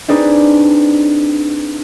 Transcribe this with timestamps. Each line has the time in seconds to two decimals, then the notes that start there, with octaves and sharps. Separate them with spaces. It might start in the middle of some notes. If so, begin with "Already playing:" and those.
0.08 C4 D4 D#4 G#4 B4